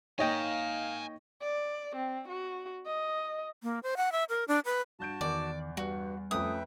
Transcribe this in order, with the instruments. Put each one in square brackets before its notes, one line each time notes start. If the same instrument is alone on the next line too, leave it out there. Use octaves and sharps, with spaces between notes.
[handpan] A#3 D#4 [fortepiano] C#5 D#5 G5 [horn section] F5 [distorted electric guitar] G#5 A#5
[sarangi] D5
C4
F#4
D#5
[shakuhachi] A#3
C5
F#5
E5
A#4
D4
B4
[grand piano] G2 G6 D7 [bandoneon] F#4 A5
[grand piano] E2 [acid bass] D#3 [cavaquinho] D5
[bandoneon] G2 [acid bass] G3 [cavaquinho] F#4
[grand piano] F2 A3 C#4 [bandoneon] B4 E5 G5 [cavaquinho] D#6